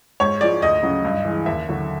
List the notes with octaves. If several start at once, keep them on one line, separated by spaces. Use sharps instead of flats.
G#2 C#5
F3 G#3 D5
D2 D#5
C#3 F#3
G2
E3 G#3
D#2 E5
D3 F#3